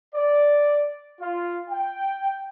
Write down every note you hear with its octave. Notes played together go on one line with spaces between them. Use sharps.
D5
F4
G5